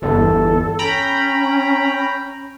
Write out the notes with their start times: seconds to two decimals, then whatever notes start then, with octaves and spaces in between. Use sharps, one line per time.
0.02 G1 E2 A4
0.79 C#4 G5 A#5 B5